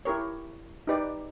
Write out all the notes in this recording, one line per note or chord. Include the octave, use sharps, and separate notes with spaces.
E4 G4 A#4 C#5
D#4 G4 B4 D5